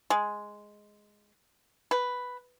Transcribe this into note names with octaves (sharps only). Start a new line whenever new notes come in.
G#3
B4